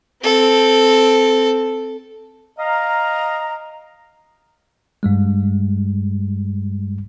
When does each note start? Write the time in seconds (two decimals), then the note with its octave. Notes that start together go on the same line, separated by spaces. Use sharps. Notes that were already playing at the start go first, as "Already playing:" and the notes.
0.23 C4 A4
2.58 D#5 F5 A#5
5.03 G2 G3 G#3